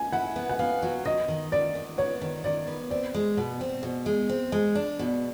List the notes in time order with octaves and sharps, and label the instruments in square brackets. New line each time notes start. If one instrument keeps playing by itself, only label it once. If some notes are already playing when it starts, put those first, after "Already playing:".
Already playing: [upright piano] G#5
[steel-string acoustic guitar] E4 [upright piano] F#5
[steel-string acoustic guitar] B3
[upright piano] F#5
[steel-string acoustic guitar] B3 [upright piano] F5
[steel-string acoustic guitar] F#3
[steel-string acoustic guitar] D#3 [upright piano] D#5
[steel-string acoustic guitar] D#3
[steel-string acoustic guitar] D#3 [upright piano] D5
[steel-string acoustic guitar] D#3
[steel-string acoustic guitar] B3 [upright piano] C#5
[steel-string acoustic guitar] D#3
[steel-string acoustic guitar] D#3 [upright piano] D5
[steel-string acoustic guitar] B3
[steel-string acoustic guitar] C4 [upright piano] D5
[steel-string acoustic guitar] G#3
B2
C4
B2
G#3
C4
G#3
D4
B2